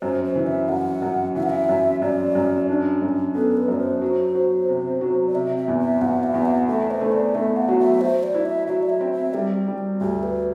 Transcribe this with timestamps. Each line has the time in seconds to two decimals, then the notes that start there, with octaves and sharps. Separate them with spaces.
0.02 F#2 C5
0.25 C5
0.36 E3
0.47 E5
0.69 F#2 F#5
1.02 F#2
1.35 E3 E5
1.43 F#5
1.50 E5
1.69 F#2
2.02 F#2 D5
2.35 F#2
2.69 D4
3.02 F#2
3.35 B3 A4
3.57 B4
3.68 F#2 D5
3.79 C5
4.01 F#3
4.35 F#3
4.68 C3
5.01 F#3
5.28 D5
5.35 C3 E5
5.57 E5
5.68 E2
5.80 E5
6.01 E2 F#5
6.23 E5
6.34 E2
6.46 F#5
6.67 A3 E5
6.91 C5
7.01 A3
7.12 D5
7.35 A3 E5
7.56 F#5
7.68 F#3
7.79 E5
8.01 F#3 C5
8.23 D5
8.35 E4
8.45 E5
8.67 F#3 E5
8.83 D5
8.89 E5
9.01 C4
9.12 E5
9.34 G3 G4
9.68 G3
10.01 D2 G4
10.23 B4